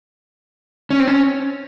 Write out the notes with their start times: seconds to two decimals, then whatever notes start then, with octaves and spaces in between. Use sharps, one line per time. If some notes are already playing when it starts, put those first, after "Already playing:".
0.91 C#4
1.00 C4
1.07 C#4